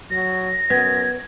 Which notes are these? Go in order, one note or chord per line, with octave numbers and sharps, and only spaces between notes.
F#3 A#6
F#2 B3 G#6